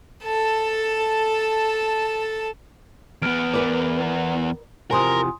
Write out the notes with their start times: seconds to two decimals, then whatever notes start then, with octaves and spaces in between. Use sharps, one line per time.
0.25 A4 A5
3.22 E2 B3 F6 D7
3.54 A#4 B4 D5
4.91 E2 C3 F3 A#4 G#5 C6 D#6